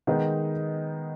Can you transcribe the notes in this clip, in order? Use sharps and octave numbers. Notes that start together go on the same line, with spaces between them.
D#3 G#3 B3 D#4